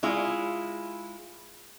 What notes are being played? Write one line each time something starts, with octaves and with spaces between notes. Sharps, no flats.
G#3 E4 F4